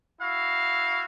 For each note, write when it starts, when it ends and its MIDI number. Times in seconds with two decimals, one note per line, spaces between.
0.21 1.05 64
0.21 1.05 66
0.21 1.05 77